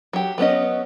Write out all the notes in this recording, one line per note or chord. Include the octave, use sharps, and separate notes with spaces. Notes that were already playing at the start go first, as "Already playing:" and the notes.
F#3 G4
F#3 B3 C#4 D#5